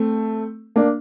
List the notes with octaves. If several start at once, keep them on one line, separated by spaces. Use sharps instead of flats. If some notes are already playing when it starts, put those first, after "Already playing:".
Already playing: A3 C4
A#3 D4